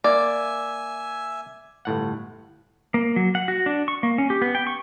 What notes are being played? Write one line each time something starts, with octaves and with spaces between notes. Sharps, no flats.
A#3 D5 E5 G#5 D6
G1 A2 F#5
A#3
F#3
F#5
F#4
D4
C#6
A#3
C#4
G4
B3
G5
C#6